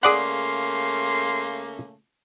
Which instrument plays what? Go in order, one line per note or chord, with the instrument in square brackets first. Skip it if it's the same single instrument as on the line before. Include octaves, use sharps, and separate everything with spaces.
[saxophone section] C#3 A3 A#3 [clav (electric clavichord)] G#4 D5 F#5 [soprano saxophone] C6